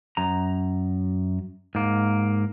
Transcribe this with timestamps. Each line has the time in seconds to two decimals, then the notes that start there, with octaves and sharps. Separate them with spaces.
0.17 F#2 A#5
1.75 G#2 A#3